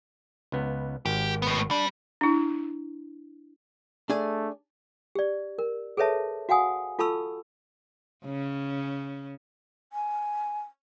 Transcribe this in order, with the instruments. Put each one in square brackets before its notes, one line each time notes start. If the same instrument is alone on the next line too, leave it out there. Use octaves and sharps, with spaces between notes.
[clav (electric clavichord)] C#2 B3
[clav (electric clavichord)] G#1 [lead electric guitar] G4
[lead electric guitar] A2 B3
[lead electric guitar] G3 [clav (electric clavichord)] D4
[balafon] D4 E4
[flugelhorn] A3 [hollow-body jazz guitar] D4 G#4 G#5
[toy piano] G4 D5
A#4
G#4 A4 B4 C#5 E5 A5
F#4 F5 F#5 G#5 D#6
F4 A4 A5 B5 C#6 E6
[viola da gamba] C#3 C#4
[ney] G#5